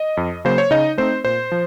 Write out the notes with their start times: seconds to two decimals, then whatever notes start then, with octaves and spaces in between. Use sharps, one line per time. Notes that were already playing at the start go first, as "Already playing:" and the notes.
Already playing: D#5
0.17 F2
0.45 C#3 F#3 A#3 C5
0.58 C#5
0.71 C#3 D#4 D#5
0.98 A3 C4 D#4 C5
1.25 A#2 C5
1.52 F3